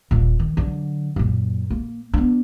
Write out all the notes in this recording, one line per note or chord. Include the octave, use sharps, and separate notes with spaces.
D#1 A#2
D#3
D3 F#3
F#2 A#2
A#3
B3 D4